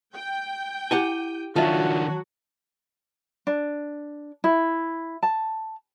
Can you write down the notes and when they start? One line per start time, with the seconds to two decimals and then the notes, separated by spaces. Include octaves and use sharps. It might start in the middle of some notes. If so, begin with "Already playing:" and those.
0.15 G5
0.91 E4 G4 F#5 G#5 D#7 G7
1.56 D#3 F#3 D4 F4 F#4 E5 A5
3.47 D4
4.44 E4
5.23 A5